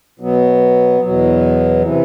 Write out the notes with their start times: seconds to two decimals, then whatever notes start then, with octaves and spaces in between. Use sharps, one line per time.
0.20 B2 F#3 B3
1.01 E2 B2 F#3
1.82 C3 E3